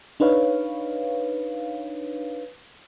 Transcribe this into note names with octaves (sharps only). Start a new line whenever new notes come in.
D4 D#4 B4 C#5 F5